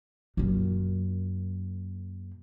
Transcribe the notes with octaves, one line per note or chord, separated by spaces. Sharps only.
F#2 A#2